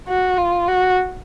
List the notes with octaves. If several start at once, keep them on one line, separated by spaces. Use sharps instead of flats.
F#4
F4
F#4